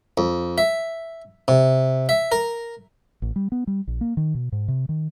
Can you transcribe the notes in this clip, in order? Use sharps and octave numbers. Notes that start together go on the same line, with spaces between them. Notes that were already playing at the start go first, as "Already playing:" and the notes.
F2
E5
C3
E5
A#4
A1
G3
B3
G3
A#1
A#3
D#3
B2
G#2
C3
D#3